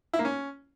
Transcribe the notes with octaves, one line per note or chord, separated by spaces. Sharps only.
E4
A#3
C#4